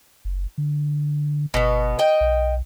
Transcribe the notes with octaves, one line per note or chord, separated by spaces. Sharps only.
F#1
D3
G1 B2 B3
D#5 G5
B1